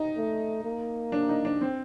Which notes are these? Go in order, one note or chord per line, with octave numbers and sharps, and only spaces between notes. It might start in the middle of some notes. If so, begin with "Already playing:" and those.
Already playing: D#4
A3
A#3
D4
D#4
D4
C4